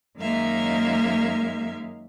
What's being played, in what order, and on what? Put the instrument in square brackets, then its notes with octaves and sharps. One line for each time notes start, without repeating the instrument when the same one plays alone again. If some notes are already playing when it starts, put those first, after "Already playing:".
[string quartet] F#2 D#3 G#3 A#3 E5 F5